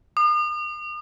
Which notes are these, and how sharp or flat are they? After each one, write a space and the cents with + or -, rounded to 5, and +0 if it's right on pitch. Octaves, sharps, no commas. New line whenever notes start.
D#6 -45